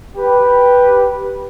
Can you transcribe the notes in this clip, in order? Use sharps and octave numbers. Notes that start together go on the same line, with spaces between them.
G4 B4